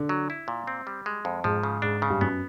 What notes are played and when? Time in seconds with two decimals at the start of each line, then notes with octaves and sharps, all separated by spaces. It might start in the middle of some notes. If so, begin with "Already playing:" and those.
Already playing: D3
0.09 F#3
0.30 E4
0.48 A#2
0.67 C4
0.87 G3
1.06 G#3
1.25 F2
1.44 G#2 F3
1.63 C#3
1.82 G#2 D4
2.02 C#3
2.10 G2
2.21 F#2 B3